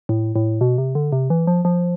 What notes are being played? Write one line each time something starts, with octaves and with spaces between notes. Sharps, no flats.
A2
A2
B2
C3
D3
C3
E3
F3
F3